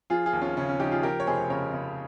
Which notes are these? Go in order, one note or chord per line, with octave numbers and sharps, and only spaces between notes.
F3 F4 G#4
F4 G#4
D#2
C#4 F4
C#3 C#4
C#4
F3 D#4 G4
F4 G#4
F3 G4 A#4
C#5
F1 G#4 C5
C#3 A#4 C#5
C#3